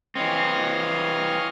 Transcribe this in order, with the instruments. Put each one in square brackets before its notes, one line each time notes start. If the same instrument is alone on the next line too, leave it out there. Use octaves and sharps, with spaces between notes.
[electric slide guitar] E3 C4 [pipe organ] C#5 D#5 F5